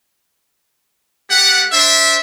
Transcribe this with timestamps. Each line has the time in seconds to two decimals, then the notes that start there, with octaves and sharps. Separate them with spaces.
1.30 A3 G4 F#5
1.72 D4 C5 E5